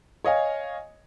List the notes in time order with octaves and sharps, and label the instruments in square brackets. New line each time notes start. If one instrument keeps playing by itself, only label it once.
[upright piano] C#5 D#5 F5 G#5